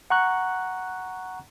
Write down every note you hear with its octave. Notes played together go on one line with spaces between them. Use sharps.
F#5 A#5 C#6 F#6